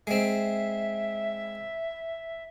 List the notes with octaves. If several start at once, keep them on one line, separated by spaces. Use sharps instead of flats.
G#3 C4 E5